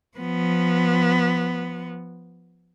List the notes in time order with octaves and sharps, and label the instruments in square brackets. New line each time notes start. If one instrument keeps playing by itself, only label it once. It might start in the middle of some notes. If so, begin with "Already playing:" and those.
[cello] F3 B3